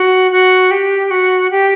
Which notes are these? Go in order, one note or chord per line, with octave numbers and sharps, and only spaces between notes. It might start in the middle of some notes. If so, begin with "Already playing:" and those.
Already playing: F#4
F#4
G4
F#4
G4